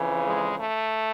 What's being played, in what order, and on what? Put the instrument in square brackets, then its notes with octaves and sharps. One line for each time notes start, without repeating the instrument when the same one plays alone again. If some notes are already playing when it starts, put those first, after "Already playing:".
Already playing: [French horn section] F2 C#3 E3
G#3
A3